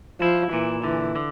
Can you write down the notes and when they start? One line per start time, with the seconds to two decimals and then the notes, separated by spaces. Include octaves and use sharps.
0.21 F3 E4
0.52 A#2 E3
0.84 D3 E3
1.16 D3